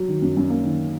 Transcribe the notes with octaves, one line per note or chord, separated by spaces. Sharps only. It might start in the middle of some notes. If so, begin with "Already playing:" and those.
Already playing: F#3
D#3
F#2
F#2
A#3
D#3